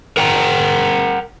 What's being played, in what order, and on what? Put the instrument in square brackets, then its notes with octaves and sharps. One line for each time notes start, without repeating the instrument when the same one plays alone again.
[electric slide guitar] A#4 F#5 G5 A#5